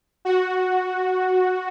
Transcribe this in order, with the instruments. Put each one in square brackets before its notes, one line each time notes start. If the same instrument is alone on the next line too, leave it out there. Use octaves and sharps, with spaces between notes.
[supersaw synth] F#4